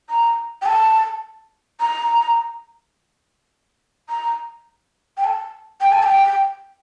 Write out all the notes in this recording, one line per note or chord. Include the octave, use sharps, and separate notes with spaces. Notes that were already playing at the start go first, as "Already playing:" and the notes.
A#5
G5
A5
A#5
A#5
G5
A5
G5
A5
G5